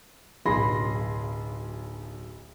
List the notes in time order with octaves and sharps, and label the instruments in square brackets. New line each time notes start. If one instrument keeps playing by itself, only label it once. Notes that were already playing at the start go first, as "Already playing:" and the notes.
[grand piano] D1 B1 G#4 B5 C6 A#6